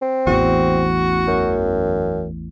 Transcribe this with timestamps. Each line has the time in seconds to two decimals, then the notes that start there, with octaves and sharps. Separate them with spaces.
0.02 C4
0.27 A1 E2 F#4
1.28 F#2